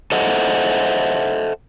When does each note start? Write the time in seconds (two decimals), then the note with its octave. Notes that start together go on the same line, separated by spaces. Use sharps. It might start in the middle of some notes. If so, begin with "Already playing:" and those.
0.12 A4 C5 D#5 E5 F#5